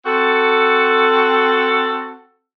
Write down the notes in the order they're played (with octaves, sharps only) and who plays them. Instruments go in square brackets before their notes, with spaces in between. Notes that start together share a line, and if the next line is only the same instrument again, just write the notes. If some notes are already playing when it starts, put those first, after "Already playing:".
[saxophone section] C4 F#4 A4